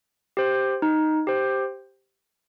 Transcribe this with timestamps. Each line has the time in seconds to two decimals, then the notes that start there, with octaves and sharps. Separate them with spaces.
0.37 G4 C5
0.82 D#4
1.27 G4 C5